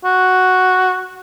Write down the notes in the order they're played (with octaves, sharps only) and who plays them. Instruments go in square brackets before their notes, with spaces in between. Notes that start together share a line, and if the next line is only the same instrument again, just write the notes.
[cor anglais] F#4